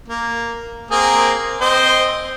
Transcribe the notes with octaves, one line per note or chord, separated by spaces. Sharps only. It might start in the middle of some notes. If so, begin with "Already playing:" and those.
A#3
A#3 C4 G#4
C4 C5 D#5